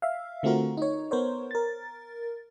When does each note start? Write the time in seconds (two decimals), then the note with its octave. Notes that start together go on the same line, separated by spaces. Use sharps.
0.02 E5 F5
0.43 D3 A3 C4 F4 F#4 A#4
0.77 D#4 C#5
1.11 B3 A#4 C5 C#5
1.51 A#4 A6